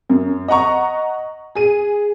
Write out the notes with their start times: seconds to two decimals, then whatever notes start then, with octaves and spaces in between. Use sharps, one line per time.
0.09 F#2
0.48 D#5 F#5 A#5 C#6
1.55 G#4 D#7